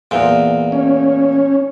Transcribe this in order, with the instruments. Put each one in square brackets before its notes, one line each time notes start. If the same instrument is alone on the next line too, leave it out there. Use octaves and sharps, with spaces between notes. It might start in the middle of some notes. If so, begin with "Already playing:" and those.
[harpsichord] E2 A#2
[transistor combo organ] C#4